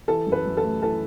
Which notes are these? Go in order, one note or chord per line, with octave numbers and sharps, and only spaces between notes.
E3 A4
F#2
B4
F#2
A4
A3
E3 A4